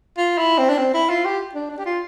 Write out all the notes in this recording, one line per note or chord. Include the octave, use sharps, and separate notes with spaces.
F4
E4
C4
D4
C4
E4
F4
G4
D4
D4
G4
F4